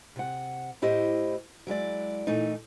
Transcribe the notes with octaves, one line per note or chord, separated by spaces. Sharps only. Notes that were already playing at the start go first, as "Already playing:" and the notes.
C3 F#5
A2 E4 G4 C5 D#5
F#3 G#3 E4 D5
A#2 E3 A3 D#4